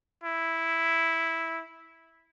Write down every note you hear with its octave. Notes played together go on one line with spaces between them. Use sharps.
E4